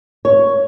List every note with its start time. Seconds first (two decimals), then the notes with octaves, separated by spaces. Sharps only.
0.25 C#5